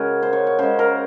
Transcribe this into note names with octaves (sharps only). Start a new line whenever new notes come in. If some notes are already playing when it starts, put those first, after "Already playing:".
Already playing: C#3 G#3 F#4 G#4 A#4
C5
C#5
C#5
C#3 G#3 C5
A#4